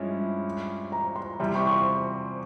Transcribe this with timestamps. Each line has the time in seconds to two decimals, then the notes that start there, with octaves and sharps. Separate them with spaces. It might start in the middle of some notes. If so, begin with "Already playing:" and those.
Already playing: G2 F3 G#3 C#4 E4
0.92 A#5
1.16 C6
1.39 E2 C3 G3 C6
1.56 C#6
1.67 C#6
1.71 C6